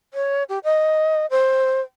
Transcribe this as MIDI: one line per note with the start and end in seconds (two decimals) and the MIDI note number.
0.14 0.43 73
0.49 0.59 67
0.64 1.26 75
1.30 1.81 72